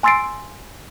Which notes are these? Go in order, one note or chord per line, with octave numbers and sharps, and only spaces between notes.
G#5 C6 E6 A6 C7 D7